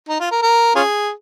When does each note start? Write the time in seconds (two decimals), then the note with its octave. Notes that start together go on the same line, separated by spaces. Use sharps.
0.09 D#4
0.20 F4
0.31 A#4
0.42 A#4
0.75 C#4 F4 G#4